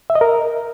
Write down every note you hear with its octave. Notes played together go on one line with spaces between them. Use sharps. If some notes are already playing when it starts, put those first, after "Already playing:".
E5
D#5
A#4